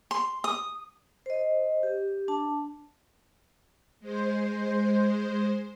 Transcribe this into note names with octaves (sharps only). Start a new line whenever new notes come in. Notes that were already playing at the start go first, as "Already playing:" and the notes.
C6
D#6
C5 D#5
G4
D4 A5
G#3 C5